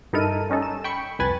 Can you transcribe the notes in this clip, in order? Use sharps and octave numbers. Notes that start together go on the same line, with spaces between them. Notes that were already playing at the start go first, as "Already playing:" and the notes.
G2 D#4 E4 A4 A#4 D#7
G3 C#4 D#4 A4
E7
G5 B5 C#6 C#7
C2 F2 B4 G#5 B5 A6